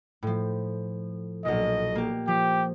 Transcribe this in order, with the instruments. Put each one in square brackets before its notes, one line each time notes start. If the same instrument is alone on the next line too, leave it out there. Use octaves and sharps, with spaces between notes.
[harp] A2 F3
[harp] B1 A#2 [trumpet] D#5
[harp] A#3 G4
[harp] F3 [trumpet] G4